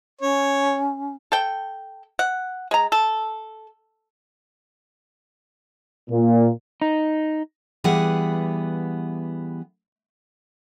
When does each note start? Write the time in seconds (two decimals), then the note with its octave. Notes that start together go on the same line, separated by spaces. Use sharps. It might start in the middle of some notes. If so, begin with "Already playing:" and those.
0.21 C#4 C#5
1.32 A4 G5
2.19 F#5
2.71 G#3 A#5
2.92 A4
6.10 A#2
6.82 D#4
7.84 E3 G3 B3 G#4 F#5